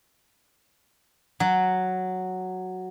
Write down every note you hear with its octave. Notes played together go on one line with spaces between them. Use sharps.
F#3